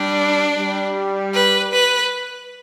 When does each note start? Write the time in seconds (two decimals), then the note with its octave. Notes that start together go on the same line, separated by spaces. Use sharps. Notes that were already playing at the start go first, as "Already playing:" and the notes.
Already playing: G3 D4
0.56 G3
1.34 B4
1.73 B4